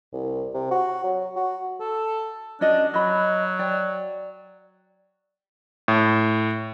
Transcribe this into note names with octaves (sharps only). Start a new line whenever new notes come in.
C2
C3
F#4
F#3
F#4
A4
C#4 D4 F#4 D#5
F#3 D#5 B5
D5 G5
A2